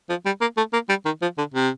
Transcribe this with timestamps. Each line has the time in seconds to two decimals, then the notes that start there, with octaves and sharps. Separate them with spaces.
0.10 F3
0.26 G3
0.41 A#3
0.57 A3
0.73 A#3
0.89 G3
1.06 D#3
1.22 F3
1.38 D3
1.54 C3